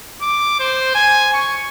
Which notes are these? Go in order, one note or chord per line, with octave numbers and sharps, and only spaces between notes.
D6
C5
G#5
C#6